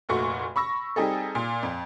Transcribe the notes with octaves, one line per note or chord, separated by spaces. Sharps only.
F1 A#2 A3 F#4 C#6
B5 C#6 E6 A#6
G3 C4 D#4 G#4 A4
A#2
F2